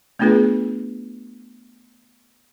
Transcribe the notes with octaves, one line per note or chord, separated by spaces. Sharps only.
A3 B3 D4 F4 G#4 B4